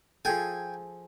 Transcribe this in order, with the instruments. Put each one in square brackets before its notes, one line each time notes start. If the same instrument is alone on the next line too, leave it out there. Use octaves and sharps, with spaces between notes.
[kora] F3 G#4 A4 [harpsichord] G5 G#5